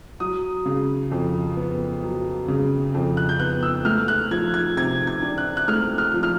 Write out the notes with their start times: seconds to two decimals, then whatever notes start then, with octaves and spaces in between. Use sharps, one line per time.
0.20 F#3 D#6
0.66 C#3
1.12 F2
1.57 B3
2.03 F#3
2.48 C#3
2.95 F2
3.17 F#6
3.29 G6
3.40 B3 F#6
3.63 E6
3.85 A3 F6
4.08 F#6
4.31 F3 G#6
4.54 G#6
4.77 C3 G#6
5.07 G#6
5.22 D4
5.38 F#6
5.57 F#6
5.68 A3 F6
5.98 F6
6.14 F3
6.23 F6